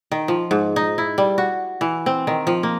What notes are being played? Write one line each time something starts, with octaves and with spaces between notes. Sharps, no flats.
D#3
F3
G#2
D#4
E4
G3
F#4
E3
C4
D#3
F3
A#3